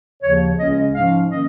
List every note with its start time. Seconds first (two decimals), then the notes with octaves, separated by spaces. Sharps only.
0.23 D#2 C#3 F3 C#5
0.58 C#2 C#3 G#3 C#4 D#5
0.94 G#2 F3 C#4 F5
1.30 D#3 A#3 C#4 D#5